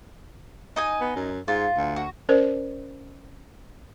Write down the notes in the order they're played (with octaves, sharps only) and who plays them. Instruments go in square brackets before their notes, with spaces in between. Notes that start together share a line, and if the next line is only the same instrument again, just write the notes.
[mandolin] D#4 D#5 G#5
[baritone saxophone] B3
F#2
[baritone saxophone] G#2 [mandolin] F4
[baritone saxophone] D2
[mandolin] F#4
[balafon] C#4 A#4 C5 D5